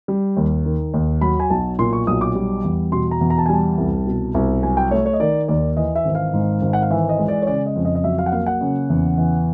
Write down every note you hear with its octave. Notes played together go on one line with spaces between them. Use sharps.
G3
D#2
D#3
D#2
F#3 B5
G#5
B1 A5
A#2 C6
C#6
B1 D#6
D6
G3
E2
B2 C6
A#5
E2
A#5
A5
G#5
G3 A5
C2
B2
C2
F#3 G#5
G5
A3 C#5
C#5
D#5
D#3 D5
D#2 D5
E3 D#5
E5
G#1
F5
G#2
G#1
F#5
F5
E3 E5
D#5
G#3
D5
C#5
C#3 D5
D#5
F2
D#5
D#5
F#3 E5
F5
F#5
A#3 F5
F#5
C#3
E2
E3